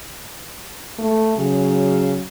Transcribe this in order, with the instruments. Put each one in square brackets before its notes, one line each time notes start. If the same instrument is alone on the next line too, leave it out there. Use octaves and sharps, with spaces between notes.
[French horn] A3
[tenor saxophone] C#3 [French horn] F#3